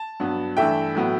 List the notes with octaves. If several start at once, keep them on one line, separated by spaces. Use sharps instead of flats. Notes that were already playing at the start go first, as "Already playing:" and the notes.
Already playing: A5
G2 F#3 B3
G2 E3 A3 E5 G5
A2 F#3 B3